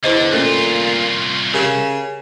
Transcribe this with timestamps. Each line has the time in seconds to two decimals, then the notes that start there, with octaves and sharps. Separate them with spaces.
0.04 E2 D3 E4 C5 D#5
0.32 C2 A#2 A3 C#4 F4 A4
1.54 C#3 G4 A#4